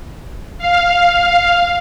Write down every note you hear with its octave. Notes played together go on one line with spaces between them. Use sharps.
F5